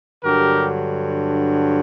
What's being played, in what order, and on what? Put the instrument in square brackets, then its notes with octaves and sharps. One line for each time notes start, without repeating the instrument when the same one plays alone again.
[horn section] G2 D3 F#3 G4 A#4